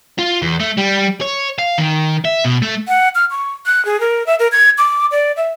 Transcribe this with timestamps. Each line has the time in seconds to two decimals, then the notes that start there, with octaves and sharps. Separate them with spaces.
0.19 F4
0.42 E2
0.60 A3
0.77 G3
1.21 C#5
1.59 F5
1.78 D#3
2.25 E5
2.45 B2
2.62 A3
2.88 F#5
3.15 F6
3.31 C#6
3.66 F#6
3.85 G#4
4.00 A#4
4.26 E5
4.39 A#4
4.52 G#6
4.78 D6
5.11 D5
5.37 E5